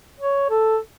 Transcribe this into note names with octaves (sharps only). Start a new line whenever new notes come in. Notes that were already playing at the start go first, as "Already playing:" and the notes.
C#5
A4